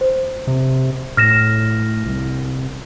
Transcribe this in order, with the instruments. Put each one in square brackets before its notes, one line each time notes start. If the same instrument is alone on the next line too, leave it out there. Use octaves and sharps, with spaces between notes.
[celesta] C5
[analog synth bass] C3
[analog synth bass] A2 [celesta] F6 A#6 E7
[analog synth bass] C2